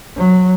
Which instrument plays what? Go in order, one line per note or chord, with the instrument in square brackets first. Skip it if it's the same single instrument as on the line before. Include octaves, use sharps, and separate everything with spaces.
[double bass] F#3